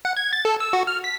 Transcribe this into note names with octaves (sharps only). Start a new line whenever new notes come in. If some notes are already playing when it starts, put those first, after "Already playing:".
F#5
G#6
A6
A4
E6
F#4
F6
B6